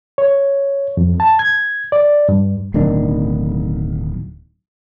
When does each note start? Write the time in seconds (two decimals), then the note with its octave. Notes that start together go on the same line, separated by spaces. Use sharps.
0.18 C#5
0.97 F2
1.20 A5
1.39 G#6
1.92 D5
2.29 G2
2.74 D1 B1 D#3 D4